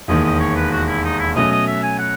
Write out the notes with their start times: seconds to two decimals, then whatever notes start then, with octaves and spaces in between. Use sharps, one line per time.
0.08 E1 D#2 D#3 D#5
0.24 D#5
0.40 C#5
0.56 B4
0.71 F#4
0.88 E4
1.03 D#4
1.19 E4
1.35 B2 F#3 A3 C#4 D#5
1.51 D#5
1.67 E5
1.83 G#5
1.99 F#5